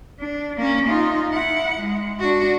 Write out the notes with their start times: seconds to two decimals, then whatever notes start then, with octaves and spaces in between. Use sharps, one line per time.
0.19 D4
0.58 A#3 C#4
0.89 D#4 F4
1.31 E4 F#5
1.79 G#3
2.20 D4 F#4